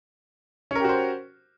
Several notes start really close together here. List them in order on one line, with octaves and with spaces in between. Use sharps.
C#4 A#4 G4 F#4 C5